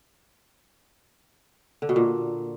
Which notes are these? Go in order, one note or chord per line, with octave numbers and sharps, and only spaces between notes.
D3
B2
A#2